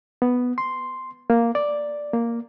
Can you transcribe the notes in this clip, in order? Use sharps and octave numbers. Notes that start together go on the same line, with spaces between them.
B3
C6
A#3
D5
A#3